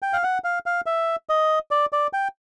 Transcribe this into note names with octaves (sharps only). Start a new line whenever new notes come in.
G5
F5
F#5
F5
F5
E5
D#5
D5
D5
G5